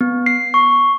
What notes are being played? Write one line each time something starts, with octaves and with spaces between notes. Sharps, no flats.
B3
C7
C#6